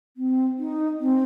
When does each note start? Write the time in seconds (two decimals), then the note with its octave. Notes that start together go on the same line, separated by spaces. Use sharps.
0.17 C4
0.58 D#4
1.00 C4